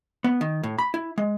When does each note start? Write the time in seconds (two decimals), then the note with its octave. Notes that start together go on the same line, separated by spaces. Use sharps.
0.24 B3
0.41 D#3
0.63 A2
0.79 B5
0.94 E4
1.18 G#3